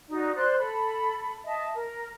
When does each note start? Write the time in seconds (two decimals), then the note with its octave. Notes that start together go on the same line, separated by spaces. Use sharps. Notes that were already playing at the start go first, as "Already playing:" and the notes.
0.10 D#4 F#4 D5
0.34 C5 D5 C6 F#6
0.58 A4 B5
1.45 D#5 E5 A5
1.74 A#4